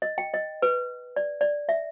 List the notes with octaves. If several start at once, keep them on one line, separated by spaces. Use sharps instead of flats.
D#5
G5
D#5
B4
D5
D5
E5